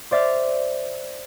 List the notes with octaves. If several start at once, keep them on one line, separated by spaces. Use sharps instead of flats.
C5 D5 E5 F6